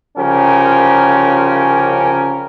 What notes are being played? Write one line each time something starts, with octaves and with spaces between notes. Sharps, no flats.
C2 C#3 F3 C#4 G4 A#4